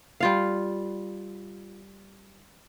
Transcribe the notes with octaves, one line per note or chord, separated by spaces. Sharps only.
G3 F4 F5